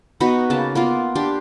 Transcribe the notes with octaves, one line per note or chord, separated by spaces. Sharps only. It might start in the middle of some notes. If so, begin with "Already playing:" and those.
B3 D#4 F#4 B4
C#3 A#3 A5
A#3 B3 F4
D4 G4 C6